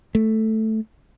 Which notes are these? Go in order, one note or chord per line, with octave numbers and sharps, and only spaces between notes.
A3